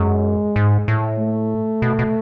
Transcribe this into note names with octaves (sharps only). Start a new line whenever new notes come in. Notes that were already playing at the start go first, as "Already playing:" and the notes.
Already playing: F#2 G#3
G#2
A2
A3
B2
B2